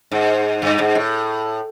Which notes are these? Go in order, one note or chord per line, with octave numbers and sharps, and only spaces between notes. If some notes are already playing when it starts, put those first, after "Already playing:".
G#2
G2
G#2
A2